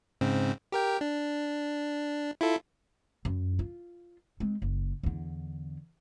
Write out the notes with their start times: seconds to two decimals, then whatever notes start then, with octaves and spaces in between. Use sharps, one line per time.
0.21 G#2 C#3 C4
0.72 G4 A#4 G5
1.01 D4
2.41 E4 F4 A4
3.25 F#2
3.59 F4
4.40 G#3 C4
4.62 F#1
5.03 E2 D3